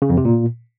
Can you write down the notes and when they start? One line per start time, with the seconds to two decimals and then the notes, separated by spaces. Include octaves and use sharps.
0.02 C#3
0.10 F2
0.17 C3
0.25 A#2